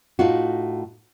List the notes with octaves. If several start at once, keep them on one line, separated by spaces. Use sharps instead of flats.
A2 D#4 F4 F#4